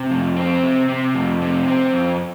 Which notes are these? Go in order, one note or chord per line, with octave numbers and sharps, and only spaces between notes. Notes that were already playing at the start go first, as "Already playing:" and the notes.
Already playing: C3
F2
C4
C3
C3
F2
C3
C4
F2